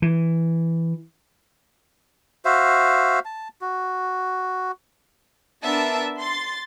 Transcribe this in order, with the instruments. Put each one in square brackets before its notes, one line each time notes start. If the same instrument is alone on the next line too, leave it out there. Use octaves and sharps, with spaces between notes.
[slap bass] E3
[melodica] F#4 C5 E5 F5
A5
F#4
[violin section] B3 D4 A#4 E5 A5
C6 A6